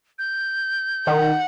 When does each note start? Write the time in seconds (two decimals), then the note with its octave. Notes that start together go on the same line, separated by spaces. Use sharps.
0.19 G6
1.07 D#3 F#5